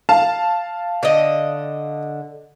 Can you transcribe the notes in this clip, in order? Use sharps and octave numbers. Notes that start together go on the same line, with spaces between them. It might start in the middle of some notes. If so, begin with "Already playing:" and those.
F5 A5
D3 D#5